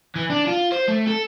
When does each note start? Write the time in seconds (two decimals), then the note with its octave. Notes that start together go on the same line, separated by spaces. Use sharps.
0.16 E3
0.30 D4
0.47 F4
0.72 C5
0.88 A3
1.08 A4